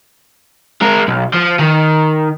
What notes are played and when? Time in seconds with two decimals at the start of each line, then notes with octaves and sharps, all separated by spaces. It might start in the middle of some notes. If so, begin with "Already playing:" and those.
0.82 G#3 A#4
1.08 B1
1.34 F3
1.59 D#3